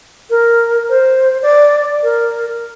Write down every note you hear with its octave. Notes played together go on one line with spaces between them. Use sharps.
A#4
C5
D5
A#4